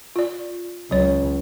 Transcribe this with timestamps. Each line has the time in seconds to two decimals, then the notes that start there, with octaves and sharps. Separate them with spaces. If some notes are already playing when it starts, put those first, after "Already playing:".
0.16 F4 D5
0.91 C#2 F#3 C#5